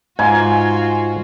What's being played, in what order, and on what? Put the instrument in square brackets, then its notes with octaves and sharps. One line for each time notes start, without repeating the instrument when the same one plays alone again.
[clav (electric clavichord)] G#2 F5 [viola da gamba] F4 F#4 [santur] G#5